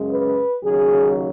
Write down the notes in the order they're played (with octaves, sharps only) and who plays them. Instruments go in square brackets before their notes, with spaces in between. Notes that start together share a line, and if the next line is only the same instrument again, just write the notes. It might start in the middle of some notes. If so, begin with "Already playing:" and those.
Already playing: [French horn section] F#2 C#3 G#3 C#4
B4
D#2 C#3 F#3 G#4